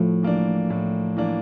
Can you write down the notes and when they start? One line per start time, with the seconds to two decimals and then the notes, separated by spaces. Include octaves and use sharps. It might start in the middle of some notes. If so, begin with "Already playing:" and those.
Already playing: A2 F3 A3
0.23 E3 A#3 D4
0.70 A2
1.17 E3 A#3 D4